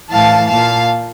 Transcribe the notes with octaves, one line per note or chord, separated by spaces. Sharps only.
A2 E3 F5 A5
A#2 F5 A5